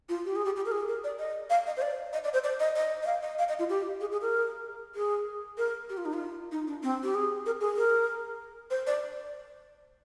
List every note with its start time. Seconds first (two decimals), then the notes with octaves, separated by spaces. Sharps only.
0.09 F4
0.25 G4
0.36 G#4
0.45 G4
0.56 G4
0.66 A#4
0.72 G#4
0.88 A#4
1.04 D5
1.19 D#5
1.50 F5
1.67 D#5
1.77 C5
1.82 D5
2.13 D#5
2.24 D5
2.33 C5
2.44 D5
2.60 D#5
2.76 D#5
3.02 D#5
3.06 F5
3.23 D#5
3.39 F5
3.48 D#5
3.59 F4
3.69 G4
4.00 G#4
4.12 G#4
4.22 A#4
4.95 G#4
5.58 A#4
5.89 G4
5.97 F4
6.05 D#4
6.13 F4
6.52 D#4
6.67 D4
6.83 C4
7.03 G4
7.15 G#4
7.46 A#4
7.61 G#4
7.76 A#4
8.70 C5
8.87 D5